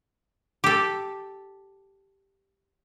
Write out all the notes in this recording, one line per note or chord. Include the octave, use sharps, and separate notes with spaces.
G4 A4